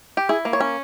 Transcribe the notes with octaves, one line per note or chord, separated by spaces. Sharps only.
G4
E4 G#4
A#3
C#5
C#4